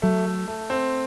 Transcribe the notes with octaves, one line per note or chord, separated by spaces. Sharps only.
F#3 A3
A3
A3
C4